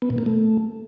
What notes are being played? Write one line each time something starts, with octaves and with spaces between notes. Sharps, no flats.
B3
A#2
A#3
A3